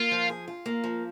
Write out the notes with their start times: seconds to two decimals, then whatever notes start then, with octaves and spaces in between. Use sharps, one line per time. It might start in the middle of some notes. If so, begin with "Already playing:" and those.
Already playing: A#3 F4
0.11 F3
0.29 G#4
0.48 F4
0.66 A#3
0.84 F3